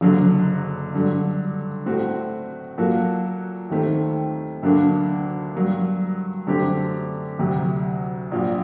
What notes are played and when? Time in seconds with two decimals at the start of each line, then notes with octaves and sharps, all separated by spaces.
0.01 F#1 F#2 D3 F#3
0.93 G2 D3 F#3
1.86 A2 A3 C4 F#4
2.78 A#2 F#3 A#3 F#4 A4
3.70 D#2 D#3 A3 C4
4.63 D2 D3 F#3 A#3 D4
5.55 G2 F#3 A#3
6.47 F#2 D3 A3 C4 G4
7.39 D2 C3 F#3
8.31 A#1 A#2 F#3